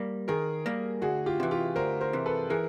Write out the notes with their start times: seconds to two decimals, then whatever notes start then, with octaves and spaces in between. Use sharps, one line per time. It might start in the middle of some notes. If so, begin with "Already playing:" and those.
Already playing: G3 A#3
0.28 D#3 G#4 A#4
0.66 G3 A#3
1.02 D2 F#4 G#4
1.26 F4 G4
1.40 C3 E3
1.51 F4 G4
1.76 D2 A#4 C5
2.01 A#4 C5
2.13 C3 E3
2.26 A4 B4
2.50 E3 G#4 A#4